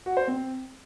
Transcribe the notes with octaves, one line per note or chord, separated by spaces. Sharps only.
F#4
C5
C4